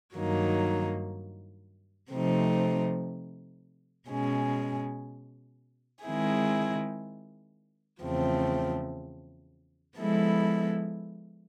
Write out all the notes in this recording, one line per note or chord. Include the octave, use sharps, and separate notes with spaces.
G2 D#3 F#3 A#3 D#4
C3 F3 A3 C4 D#4
B2 G#3 C#4
D#3 G#3 C4 E4 G#4
E2 C#3 F3 A3 C4
F3 G#3 B3 E4 A4